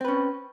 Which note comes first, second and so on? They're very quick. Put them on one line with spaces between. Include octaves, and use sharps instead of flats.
C4 B4 C#4